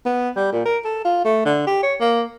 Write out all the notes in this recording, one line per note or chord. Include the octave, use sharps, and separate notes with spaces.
B3
G3
A#2
A#4
A4
F4
A3
D3
G4
C#5
A#3